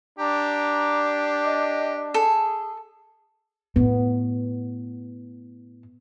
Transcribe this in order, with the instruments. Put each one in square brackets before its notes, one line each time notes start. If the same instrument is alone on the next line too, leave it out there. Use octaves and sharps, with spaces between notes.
[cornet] D4 [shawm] G4 [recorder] A#5
[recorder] D#5
[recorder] G#4 [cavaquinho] A4
[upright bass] A2 [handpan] B3